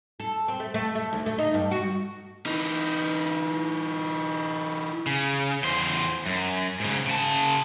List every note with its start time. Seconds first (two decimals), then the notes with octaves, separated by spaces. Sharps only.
0.20 A4
0.48 C4
0.60 A3
0.74 A3
0.95 A3
1.13 D2
1.26 A3
1.39 D#4
1.54 G2
1.71 F#4
2.46 E3 D#4
5.07 C#3
5.63 E2 C5
6.26 F#2
6.80 G#2 C#3
7.07 C#3 A5